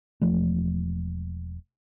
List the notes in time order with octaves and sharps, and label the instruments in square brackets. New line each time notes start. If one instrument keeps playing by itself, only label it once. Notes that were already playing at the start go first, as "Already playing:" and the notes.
[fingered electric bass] E1 F3 A3